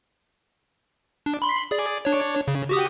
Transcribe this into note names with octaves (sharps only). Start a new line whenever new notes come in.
D4
B5 C6
G#4 D5
D4 C#5
C#3
F#4 G4 D#6